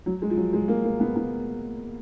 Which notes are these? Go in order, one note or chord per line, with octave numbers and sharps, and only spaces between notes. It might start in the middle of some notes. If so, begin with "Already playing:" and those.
F#3
G#3
F3
F#3
G#3
A#3
A#3
B3
B3